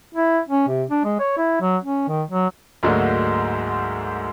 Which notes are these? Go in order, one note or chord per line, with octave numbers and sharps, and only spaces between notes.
E4
C#4
C3
D4
G#3
C#5
E4
F#3
C#4
D#3
F#3
D2 G#2 D3 F#3 G#3 A#3